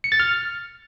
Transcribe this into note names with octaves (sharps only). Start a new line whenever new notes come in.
C#7
A6
F6